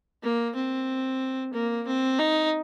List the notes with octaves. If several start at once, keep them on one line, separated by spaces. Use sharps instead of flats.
A#3
C4
A#3
C4
D#4